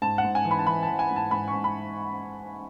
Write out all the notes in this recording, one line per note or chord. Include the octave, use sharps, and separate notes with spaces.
G#2 A5
F#5
G#2
G#5
E3
B5
A5
E3 B5
A5
E3
G#5
G#2
A5
G#2 B5
C#6
G#2
B5